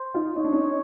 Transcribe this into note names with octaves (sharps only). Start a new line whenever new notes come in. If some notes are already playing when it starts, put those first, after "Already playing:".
Already playing: C5
D#4 F4
D#4 C#5
D4
C#4 D#4